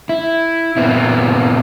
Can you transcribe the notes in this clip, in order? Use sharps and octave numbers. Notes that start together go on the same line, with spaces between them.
E4
A#2 B3 C4 E4